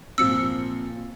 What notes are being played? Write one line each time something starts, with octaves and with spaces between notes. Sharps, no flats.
A#2 F3 C4 E6 C#7